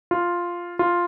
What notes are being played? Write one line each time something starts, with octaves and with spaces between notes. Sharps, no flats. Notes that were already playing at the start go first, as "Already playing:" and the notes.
F4
F4